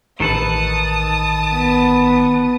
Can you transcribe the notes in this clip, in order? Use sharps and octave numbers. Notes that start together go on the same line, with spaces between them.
A1 D#3 A4 B4 A5 D#6
B3